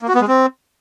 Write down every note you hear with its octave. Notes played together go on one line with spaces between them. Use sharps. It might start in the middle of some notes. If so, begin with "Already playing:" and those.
A#3
F#4
B3
G#3
C4